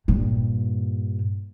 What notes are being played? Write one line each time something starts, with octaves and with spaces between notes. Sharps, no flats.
G2 A#2